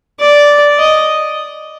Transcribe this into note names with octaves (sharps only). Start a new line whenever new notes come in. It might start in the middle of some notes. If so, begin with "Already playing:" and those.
D5
D#5